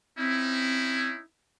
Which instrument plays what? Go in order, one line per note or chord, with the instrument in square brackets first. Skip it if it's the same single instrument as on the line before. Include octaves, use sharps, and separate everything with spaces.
[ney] C4 [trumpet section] C#4 D#4 E4